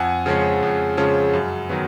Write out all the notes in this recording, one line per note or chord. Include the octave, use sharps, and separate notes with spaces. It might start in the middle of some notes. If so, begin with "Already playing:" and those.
Already playing: F2 F#5 G#5
C#3 F3 G#3 C#4
F2
C#3 F3 G#3 C#4
F#2
D#3 F#3 B3